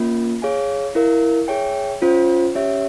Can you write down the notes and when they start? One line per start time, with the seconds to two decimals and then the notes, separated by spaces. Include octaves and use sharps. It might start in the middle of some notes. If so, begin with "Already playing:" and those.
Already playing: A#3 C#4 F4
0.42 G#4 C#5 F5 G#5
0.95 E4 A#4 F5
1.48 G#4 C#5 E5 G5
2.02 C#4 F4 C5
2.55 C#4 G4 C#5 E5